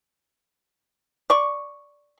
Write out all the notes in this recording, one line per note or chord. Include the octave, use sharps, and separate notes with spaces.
D5 C#6